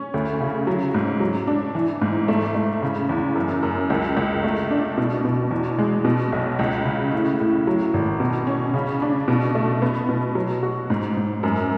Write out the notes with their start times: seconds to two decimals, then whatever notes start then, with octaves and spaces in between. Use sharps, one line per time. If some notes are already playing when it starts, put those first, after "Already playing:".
Already playing: C#4
0.14 D2
0.41 C#3
0.67 F#3
0.94 G#2
1.20 F#3
1.47 D4
1.75 E3
2.02 G#2
2.28 A3
2.55 A3
2.82 C#3
3.09 E2
3.35 F#2
3.63 F#2
3.90 C#2
4.17 C#2
4.44 A3
4.71 D4
4.98 B2
5.25 B2
5.51 E2
5.78 G#3
6.05 B2
6.32 B1
6.59 C#2
6.85 C#3
7.12 A2
7.40 A2
7.67 F#3
7.94 G#1
8.20 B2
8.47 C#4
8.74 C#3
9.02 D4
9.28 B2
9.55 A3
9.82 B3
10.09 B2
10.35 F#3
10.63 F#4
10.90 G#2
11.17 G#2
11.43 F#2